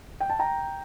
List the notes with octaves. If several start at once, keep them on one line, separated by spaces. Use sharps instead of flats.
G5
A5
G5 A#5